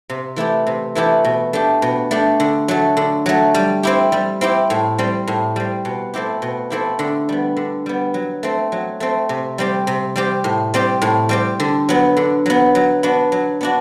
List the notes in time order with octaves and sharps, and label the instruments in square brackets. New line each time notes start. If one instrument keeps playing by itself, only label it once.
[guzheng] C3
E3 A3 E4 G4
C3
E3 A3 E4 G4
B2
A3 D4 G4
B2
A3 D4 G4
D3
F#3 A3
D3
F#3 A3
G3
C4 E4 G4
G3
C4 E4 G4
A2
G3 C4
A2
G3 C4
B2
A3 C4 E4 G4
B2
A3 C4 E4 G4
D3
G3 B3
D3
G3 B3
F#3
A3 C4
F#3
A3 C4
C3
G3 C4 G4
C3
G3 C4 G4
A2
G3 C4 G4
A2
G3 C4 G4
D3
F#3 B3
D3
F#3 B3
F#3
B3 D4 F#4
F#3
B3 D4 F#4